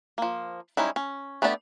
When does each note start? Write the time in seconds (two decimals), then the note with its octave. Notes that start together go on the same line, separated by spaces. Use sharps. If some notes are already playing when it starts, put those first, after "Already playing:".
0.18 F3 A#3
0.77 G3 G#3 C#4 D#4 E4
0.96 C#4
1.42 A3 B3 D4 G4 D5